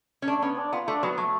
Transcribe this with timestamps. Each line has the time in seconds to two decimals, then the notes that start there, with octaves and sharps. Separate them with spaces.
0.22 C#4
0.28 A3 D4
0.42 B3 C#4
0.58 D4
0.73 B3 F4
0.88 A3 D4
1.03 F#3 B3
1.18 F#3 A3